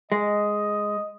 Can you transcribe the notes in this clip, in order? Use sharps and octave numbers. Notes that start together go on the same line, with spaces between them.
G#3 D#5